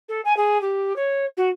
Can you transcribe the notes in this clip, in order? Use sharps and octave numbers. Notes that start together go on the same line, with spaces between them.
A4
G#5
G#4
G4
C#5
F#4